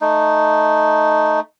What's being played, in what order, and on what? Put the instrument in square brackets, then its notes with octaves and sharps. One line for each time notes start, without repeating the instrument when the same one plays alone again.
[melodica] A3 D#4